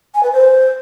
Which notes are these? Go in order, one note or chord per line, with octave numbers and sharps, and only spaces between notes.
G#5
B4
C5